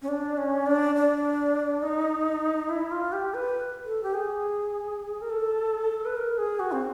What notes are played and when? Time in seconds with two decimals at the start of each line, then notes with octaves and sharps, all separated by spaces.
0.02 C#4
0.08 D4
0.37 C#4
0.66 D4
0.95 D4
1.82 D#4
2.69 E4
2.91 F4
3.12 G4
3.34 B4
3.85 A4
4.03 G4
4.14 G#4
5.21 A#4
5.30 A4
6.05 B4
6.16 A#4
6.38 G#4
6.60 F#4
6.72 C4